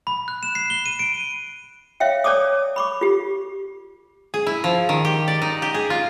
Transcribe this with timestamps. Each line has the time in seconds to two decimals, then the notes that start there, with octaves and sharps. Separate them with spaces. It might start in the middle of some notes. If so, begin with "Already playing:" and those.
0.07 B5
0.28 F#6
0.43 E7
0.55 C7
0.70 G7
0.86 D#7
0.99 D7
2.00 C#5 E5 F5 G5
2.24 C#5 D5 A5 D6 D#6
2.76 B5 C#6 D6
3.01 F4 G4
4.34 G#4
4.47 E4
4.64 F3
4.89 D#3
5.05 G4
5.28 D5
5.42 D#4
5.62 G4
5.74 G#4
5.90 F4